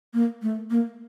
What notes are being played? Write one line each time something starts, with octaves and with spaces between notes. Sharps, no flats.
A#3
A3
A#3